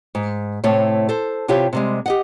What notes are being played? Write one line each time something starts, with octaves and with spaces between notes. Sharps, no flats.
G#2
A2 C3 A3 C#5
A4 C5
C3 E4 F4 G4 C#5
C3 G3 G#3
G4 D#5 F#5